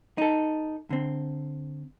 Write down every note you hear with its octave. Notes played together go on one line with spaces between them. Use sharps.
D#4 A4
D3 C4